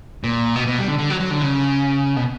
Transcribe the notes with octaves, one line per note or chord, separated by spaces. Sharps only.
A#2
B2
B2
G3
D3
D3
F#3
F#3
D3
C#3
B2